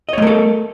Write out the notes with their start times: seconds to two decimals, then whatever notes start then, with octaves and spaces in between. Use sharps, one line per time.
0.09 D#5
0.13 C#5
0.18 A3
0.22 A#4
0.27 A4